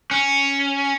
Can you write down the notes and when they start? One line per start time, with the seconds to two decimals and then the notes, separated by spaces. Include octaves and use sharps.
0.11 C#4